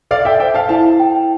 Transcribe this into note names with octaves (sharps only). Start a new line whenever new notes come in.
A4 D5 F5
E5 G5
C5 E5 G5
F5 A5
E4 F5 A5
G5